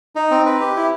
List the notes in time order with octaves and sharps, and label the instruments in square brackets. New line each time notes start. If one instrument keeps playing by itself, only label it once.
[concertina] D#4
C4
B4
G4
E4